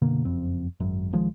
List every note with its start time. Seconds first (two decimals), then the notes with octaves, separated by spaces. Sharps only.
0.02 F#1 B2 D3 A#3
0.25 F#1 F2 C4
0.80 G#1 F#2
1.13 B1 D#3 F3 G#3